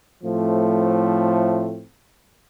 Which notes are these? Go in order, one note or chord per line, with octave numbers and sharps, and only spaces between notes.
A2 F3 A3 C4